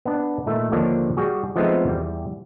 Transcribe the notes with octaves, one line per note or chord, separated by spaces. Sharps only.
B3 D4
A#2 D#3 A3
D#2 D3 F3 A#3 D4 C#5
G3 F#4 G#4
F3 G#3 A3 B3 C4 D#4
E2 G3